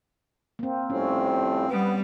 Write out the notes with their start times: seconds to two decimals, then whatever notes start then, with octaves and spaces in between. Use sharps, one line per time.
0.59 A#3 C4
0.90 A2 F3 G3 C4 C#4
1.69 G3 B3